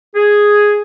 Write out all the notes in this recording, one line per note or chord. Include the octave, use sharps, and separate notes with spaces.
G#4